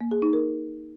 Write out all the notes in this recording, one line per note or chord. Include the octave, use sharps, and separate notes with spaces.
A#3
G#4
D#4
A#4